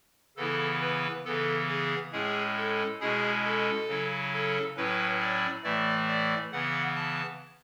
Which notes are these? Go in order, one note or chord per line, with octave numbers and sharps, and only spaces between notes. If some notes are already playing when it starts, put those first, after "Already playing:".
C#3 E3 B3 E4 A4
B4
C#3 E3 B3 A4
G#4
A2 G#3 C#4 E4 G#4
A4
B2 G#3 C#4 E4 G#4
A4
C#3 F#3 C#4 E4
A4
A2 F#3 C#4 E4 B4
D5
A2 E3 A3 E4 D5
D5
C#3 E3 B3 F#5
A5